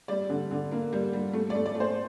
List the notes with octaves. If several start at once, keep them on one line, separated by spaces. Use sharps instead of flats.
G3 D5
D3
D3
A#3
G3
G3
A3
D5
A3
D5
A3
C5